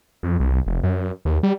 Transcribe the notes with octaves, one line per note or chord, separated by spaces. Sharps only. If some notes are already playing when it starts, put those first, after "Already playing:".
F2
C2
F1
F#2
D#2
G3